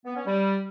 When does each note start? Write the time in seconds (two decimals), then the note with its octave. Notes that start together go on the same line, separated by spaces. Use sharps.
0.05 B3
0.16 C#4
0.26 G3